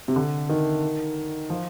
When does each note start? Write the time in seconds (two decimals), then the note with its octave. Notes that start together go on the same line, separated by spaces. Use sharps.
0.08 C3
0.16 D3
0.49 D#3
1.50 F3